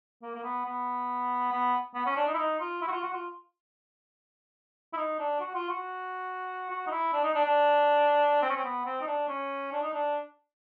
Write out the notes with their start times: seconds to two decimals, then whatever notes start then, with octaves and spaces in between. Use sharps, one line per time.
0.23 A#3
0.35 A#3
0.43 B3
0.65 B3
1.52 B3
1.95 B3
2.06 C#4
2.16 D4
2.27 D#4
2.34 E4
2.38 D#4
2.60 F4
2.82 E4
2.87 F#4
2.92 F4
3.03 F#4
3.13 F4
4.93 E4
4.97 D#4
5.19 D4
5.40 F#4
5.54 F4
5.69 F#4
6.70 F#4
6.87 D#4
6.91 E4
7.13 D4
7.24 D#4
7.34 D4
7.45 D4
8.42 C4
8.50 C#4
8.56 C4
8.64 B3
8.86 C4
9.01 D#4
9.07 D4
9.28 C#4
9.72 D4
9.82 D#4
9.93 D4